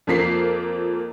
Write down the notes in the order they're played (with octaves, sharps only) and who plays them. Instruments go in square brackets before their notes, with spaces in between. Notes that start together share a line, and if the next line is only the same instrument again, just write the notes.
[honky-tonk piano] F2 F3 A#3 B6 C7